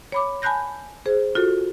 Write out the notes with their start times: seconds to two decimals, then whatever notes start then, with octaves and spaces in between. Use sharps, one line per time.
0.12 C#5 B5 D6
0.42 G#5 A5 B5 F#6 G6 A#6
1.06 G#4 C5
1.35 F4 F#4 A4